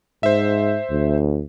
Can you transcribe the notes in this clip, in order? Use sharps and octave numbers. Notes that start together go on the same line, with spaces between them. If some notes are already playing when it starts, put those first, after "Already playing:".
G#2 C5 E5
D2